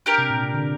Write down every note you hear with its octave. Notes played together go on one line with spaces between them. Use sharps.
D4 G4 A#4
C3
A#2
C3
D3